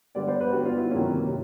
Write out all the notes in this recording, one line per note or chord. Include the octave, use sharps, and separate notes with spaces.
D3 G3 B3 D5
C5
B4
D3 G3 B3 F#4
F4
E4
C3 D#3 F#3 A#3 C#4 E4
C3